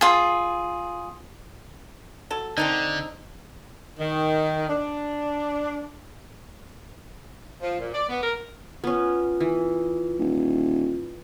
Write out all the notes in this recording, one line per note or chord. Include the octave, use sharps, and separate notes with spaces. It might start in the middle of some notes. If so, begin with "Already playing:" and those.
F4 G#4
F#3 A4
D3 C4 D4 D#4
D#3
D4
F3
A#2
D5
B3
A#4
B3 C#4 F4
E3
D#1